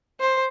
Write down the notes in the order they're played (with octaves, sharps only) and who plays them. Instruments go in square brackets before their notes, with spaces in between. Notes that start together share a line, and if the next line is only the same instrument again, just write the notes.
[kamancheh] C5